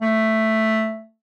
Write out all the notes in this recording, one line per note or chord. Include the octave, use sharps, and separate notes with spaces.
A3